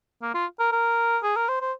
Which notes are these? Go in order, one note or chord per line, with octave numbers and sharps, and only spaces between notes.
A#3
F4
A#4
A#4
G#4
A#4
C5
C5